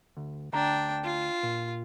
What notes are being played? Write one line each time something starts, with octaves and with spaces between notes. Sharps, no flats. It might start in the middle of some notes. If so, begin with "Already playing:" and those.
D2
D2 D4 G5 A#5
F4
A#2